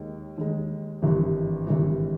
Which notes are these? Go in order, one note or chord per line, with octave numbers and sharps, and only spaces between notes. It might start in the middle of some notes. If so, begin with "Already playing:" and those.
Already playing: D#2 D#3 G#3
D#2 D#3 G#3
G#1 G2 E3 G3
G#1 G2 E3 G3